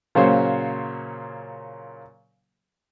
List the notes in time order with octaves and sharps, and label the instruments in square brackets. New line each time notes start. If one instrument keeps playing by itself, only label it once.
[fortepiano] A#2 C#3 F#3 A#3 C5 C#5